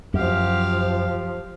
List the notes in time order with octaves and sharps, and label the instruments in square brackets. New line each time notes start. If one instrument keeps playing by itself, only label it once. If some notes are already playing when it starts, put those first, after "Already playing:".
[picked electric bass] F#2 [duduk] F3 [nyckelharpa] G4 F5